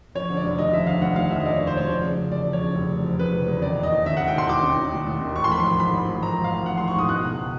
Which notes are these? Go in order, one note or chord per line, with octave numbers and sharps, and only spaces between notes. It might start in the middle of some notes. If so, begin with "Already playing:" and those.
F3 C#5
D3
D5
F1
D#2 D#5
F3 E5
D3 F5
F1 F#5
D#2 F5
F3 E5
D#5
D3 D5
C#5
F1
C5
D#2 C#5
F3 D5
C#3
F1
E2 D5
F3
C#5
C#3
F1
E2
F3
C#3 B4
F1
E2
D#3 D5
D#2
D#5
D#2
D#3 E5
F#5
D#3
G5
D#2 C6
D#2 D6
D#3
D#3
D#2
D#2
D#3
A1 C#6
C6
F3 B5
A1 C6
G#2 B5
A1
F3
A1 A#5
G#2
F5
A1
F3 F#5
C6
A1
C#6
G#2 D#6
B2 F#6
C#2